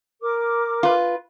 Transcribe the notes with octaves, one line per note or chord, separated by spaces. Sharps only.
A#4 D6
F4 B4